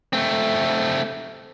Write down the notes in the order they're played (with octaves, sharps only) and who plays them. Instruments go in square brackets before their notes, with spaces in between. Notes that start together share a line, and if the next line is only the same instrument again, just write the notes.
[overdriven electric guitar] A3 C4